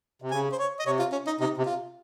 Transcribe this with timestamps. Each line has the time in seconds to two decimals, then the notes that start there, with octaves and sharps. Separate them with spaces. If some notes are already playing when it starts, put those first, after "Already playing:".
0.22 C3
0.31 C#3 G#5
0.52 C5
0.59 C#5
0.79 D#5
0.86 C3 C#5
0.99 F4
1.12 C#4
1.27 D#4
1.40 C3 D#4
1.57 C3
1.66 F4